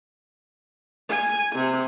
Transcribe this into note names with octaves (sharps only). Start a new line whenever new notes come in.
G#5
C3